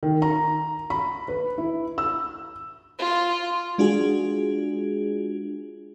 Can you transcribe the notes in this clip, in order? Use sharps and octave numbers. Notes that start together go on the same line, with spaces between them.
D#3
A#5
B5
B4
E4
E6
F4
G#3 D4 F4 F#4 G#4